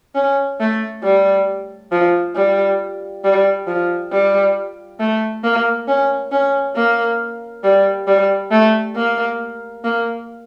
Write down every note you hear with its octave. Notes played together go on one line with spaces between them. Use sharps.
C#4
A3
G3
F3
G3
G3
F3
G3
A3
A#3
C#4
C#4
A#3
G3
G3
A3
A#3
A#3